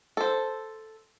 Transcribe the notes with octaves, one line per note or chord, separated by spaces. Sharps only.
A4 C5